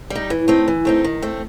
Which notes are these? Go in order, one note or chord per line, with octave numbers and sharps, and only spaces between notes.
G3
D#4
E3
A3 C4 D#4
E3
A3 C4 D#4
D#3
A3 C4